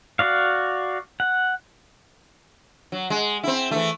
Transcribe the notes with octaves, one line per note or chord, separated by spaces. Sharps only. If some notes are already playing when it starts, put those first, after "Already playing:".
F#4 D5 F5
F#5
F#3
G#3
C4 E4
E3 A3